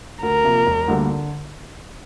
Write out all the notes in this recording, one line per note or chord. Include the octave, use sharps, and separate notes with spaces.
D2 A#4
C3 F3 A#3
E1
D2 D3 G3 A#3
D3